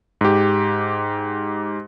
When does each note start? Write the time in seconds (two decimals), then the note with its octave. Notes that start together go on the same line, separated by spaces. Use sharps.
0.21 G#2 G4